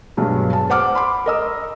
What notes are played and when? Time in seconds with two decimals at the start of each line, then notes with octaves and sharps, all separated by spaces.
0.17 B1 G2 F#3 G#3
0.53 A5
0.70 C5 F#5 D6 F6
0.95 B5 C6 D6
1.26 A#4 D#5 E6